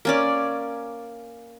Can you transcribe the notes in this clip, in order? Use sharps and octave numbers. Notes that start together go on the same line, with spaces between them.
A#3 C#4 D5